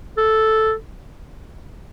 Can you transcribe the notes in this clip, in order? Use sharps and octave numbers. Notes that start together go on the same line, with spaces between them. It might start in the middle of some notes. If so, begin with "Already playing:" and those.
A4